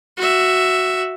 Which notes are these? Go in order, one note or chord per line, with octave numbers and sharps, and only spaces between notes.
F#4 E5